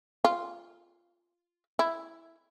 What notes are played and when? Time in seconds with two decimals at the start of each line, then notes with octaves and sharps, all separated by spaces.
0.25 F4
1.79 E4